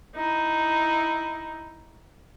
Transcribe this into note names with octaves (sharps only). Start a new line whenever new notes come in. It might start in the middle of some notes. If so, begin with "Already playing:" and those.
D#4 E4